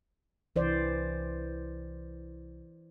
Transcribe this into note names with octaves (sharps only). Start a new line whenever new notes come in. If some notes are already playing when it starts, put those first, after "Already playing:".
C2 E3 C5 D5